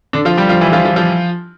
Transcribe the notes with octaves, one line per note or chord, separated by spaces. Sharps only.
D3 D4
F3 F4
G3 G4
F3 F4
E3 E4
F3 F4
F3 F4
F3 F4